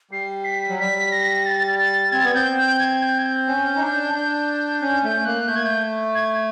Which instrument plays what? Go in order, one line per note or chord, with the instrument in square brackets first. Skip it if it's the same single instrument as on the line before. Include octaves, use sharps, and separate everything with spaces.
[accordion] G3 [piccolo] C7
[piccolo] B6
[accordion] F#3
[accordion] G3 [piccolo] B6
[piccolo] A#6
A6
A6
[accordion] C4 [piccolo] G#6
[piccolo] A6
[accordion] B3 [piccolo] G#6
[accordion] C4 [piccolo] G6
[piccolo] G6
G#6
G6
G#6
G6
[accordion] C#4
D#4
D4
D4
[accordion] C#4 [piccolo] G6
[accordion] A3 [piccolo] G6
[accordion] A#3 [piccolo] F#6
[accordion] A3 [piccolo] G6
[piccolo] G#6
G6
G#6